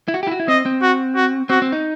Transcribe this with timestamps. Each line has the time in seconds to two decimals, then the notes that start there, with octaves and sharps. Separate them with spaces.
0.08 E4
0.14 F#4
0.23 G4
0.27 E4
0.31 F#4
0.40 E4
0.48 C4 D#5
0.66 C4
0.82 F#4
1.16 F#4
1.50 C4 F#4
1.62 C4
1.72 D#4